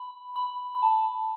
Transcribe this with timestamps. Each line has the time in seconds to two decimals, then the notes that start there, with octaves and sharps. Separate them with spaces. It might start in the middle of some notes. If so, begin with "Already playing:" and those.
Already playing: B5
0.36 B5
0.75 B5
0.82 A5